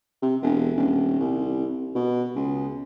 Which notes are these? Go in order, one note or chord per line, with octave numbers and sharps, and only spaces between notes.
C3
E1
D#1
C2
B2
C#2